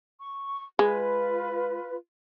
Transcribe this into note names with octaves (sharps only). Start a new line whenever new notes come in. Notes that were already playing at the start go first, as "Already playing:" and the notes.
C#6
G#3 F4 B4